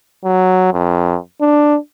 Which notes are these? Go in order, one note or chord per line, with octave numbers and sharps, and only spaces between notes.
F#3
F2
D4